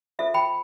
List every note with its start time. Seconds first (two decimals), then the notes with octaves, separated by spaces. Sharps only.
0.19 F4 A4 C5 E5
0.34 G5 B5